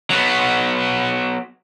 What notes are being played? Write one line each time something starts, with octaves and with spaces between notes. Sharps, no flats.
F#3 B3